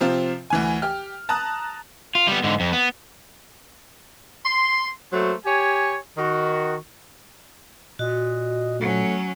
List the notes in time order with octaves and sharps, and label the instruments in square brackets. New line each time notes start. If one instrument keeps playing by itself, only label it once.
[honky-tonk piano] C3 F3 C4 F4
D2 E3 G#5
G4 F6
A5 A#5 D#6 F#6
[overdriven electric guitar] F4
G3 B3
G#2 D3
F2
B3
[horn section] C6
F#3 A3 A#3 C5
G4 C#5 G#5
D#3 F#4
[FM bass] A#2 [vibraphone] F#4 [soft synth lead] D#5
[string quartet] F#3 C#4 [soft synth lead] A3